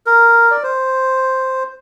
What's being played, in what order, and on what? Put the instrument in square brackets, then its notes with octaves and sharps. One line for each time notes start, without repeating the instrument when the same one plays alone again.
[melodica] A#4
D5
C5